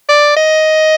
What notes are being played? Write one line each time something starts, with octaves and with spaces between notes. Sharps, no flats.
D5
D#5